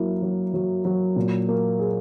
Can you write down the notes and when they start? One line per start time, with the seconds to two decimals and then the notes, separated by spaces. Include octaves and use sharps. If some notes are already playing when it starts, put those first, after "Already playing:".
Already playing: F#3 A#3 E4
0.22 F#3
0.54 F#3
0.85 F#3
1.16 A#2
1.49 A#3
1.79 G#4